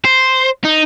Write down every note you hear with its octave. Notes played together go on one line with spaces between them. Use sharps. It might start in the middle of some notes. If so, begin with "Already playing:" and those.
C5
D#4